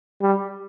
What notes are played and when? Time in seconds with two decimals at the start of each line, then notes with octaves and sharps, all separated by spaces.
0.22 G3